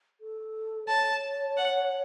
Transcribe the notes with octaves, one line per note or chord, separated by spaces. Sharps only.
A4
C#5 A5
F#5